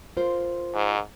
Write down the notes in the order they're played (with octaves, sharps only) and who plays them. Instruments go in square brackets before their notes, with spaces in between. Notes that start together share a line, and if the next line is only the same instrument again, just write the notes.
[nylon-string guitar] F4 A#4 C5
[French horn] G#2